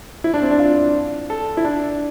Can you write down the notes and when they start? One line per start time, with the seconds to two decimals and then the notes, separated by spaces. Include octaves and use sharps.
0.24 E4
0.34 D4
0.42 C4
0.51 D4
0.59 F4
1.30 A4
1.57 E4
1.65 D4